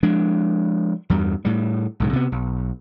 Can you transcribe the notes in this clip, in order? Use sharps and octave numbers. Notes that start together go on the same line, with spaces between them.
F3 G#3 D4
E2 G2 G3
A2 G3
B1 G#2 C#3
C3 B3
B1